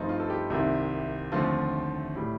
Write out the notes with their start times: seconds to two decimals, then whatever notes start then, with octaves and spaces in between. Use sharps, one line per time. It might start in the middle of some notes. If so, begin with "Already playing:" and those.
Already playing: G2 F3 A3 C4 D#4
0.09 F4
0.20 A4
0.30 G4
0.50 C2 C3 D#3 A#3
1.32 D#2 D3 F3 A3 C4 F4
2.15 A2 G3